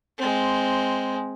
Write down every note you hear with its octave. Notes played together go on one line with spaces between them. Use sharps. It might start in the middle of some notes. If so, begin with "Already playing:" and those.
G#3 C4